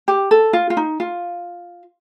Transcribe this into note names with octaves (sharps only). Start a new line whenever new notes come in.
G4
A4
F4
F4
D#4
F4